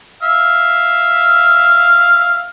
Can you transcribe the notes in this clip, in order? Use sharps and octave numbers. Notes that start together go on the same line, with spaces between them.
E5 F5